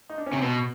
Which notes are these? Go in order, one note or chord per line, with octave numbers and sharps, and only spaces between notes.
D#4
D4
C#4
C3 C4
B2 B3